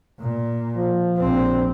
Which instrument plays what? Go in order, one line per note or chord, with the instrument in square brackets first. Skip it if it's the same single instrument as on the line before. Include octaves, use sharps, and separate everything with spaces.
[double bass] A#2
[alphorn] F3
[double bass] A#1 C4